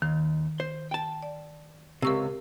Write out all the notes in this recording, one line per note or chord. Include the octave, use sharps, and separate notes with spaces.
D#2 D#3
C5
G5 A5
D5
C#2 C3 A#4 C#6 E6